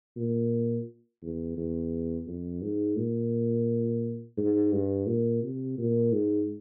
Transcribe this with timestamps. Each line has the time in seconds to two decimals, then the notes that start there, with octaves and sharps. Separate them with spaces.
0.17 A#2
1.23 E2
1.57 E2
2.27 F2
2.62 G#2
2.97 A#2
4.37 G#2
4.72 G2
5.07 A#2
5.43 C3
5.78 A#2
6.13 G#2